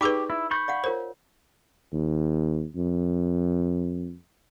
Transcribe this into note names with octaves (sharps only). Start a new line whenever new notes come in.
D#4 G4 G#4 B4 D5 C#6 D6
E4
B5 C#6 G6
D5 F5 F#5
F4 A#4 C5 C#5
D#2
F2